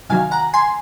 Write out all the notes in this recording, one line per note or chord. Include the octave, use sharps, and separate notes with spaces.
C3 D#3 F#3 F5 G#5
F#5 A#5
G#5 C6